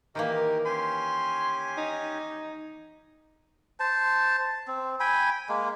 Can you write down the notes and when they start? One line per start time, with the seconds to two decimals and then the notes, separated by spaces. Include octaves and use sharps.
0.15 D#3 E3 A#3 G4 A#4 D#5
0.65 C#4 G4 G#5 C6
1.77 D#4
3.80 C5 A5
4.67 C4
5.00 G5 G#5 B5
5.49 G#3 A#3